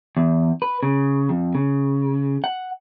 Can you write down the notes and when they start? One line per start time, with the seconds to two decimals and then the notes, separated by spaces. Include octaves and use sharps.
0.17 E2
0.62 B4
0.83 C#3
1.29 F2
1.55 C#3
2.44 F#5